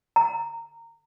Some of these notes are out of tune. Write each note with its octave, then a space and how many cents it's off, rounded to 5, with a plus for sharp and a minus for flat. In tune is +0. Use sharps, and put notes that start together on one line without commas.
A#5 -20